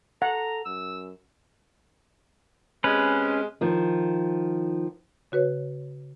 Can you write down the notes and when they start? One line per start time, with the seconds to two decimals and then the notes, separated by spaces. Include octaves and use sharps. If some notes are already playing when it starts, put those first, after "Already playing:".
0.22 A4 F#5 A#5
0.65 F#2 E6
2.84 C3 G#3 C#4 B4
3.61 D#3 F3
5.32 C#3 F#4 B4 C#5